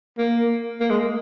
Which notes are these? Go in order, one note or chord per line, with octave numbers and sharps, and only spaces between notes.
A#3
A#3
G#3